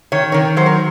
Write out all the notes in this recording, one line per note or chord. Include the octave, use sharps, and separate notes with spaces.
D#3 C#5
D#3 A#4 C#5
F#3 C5
A#4